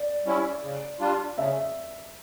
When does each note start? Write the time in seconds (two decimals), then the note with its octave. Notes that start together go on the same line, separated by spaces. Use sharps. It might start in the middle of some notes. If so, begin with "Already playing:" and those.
Already playing: D5
0.25 G3 C#4 E4
0.62 C#3
0.99 G3 D4 F4
1.38 C#3 E5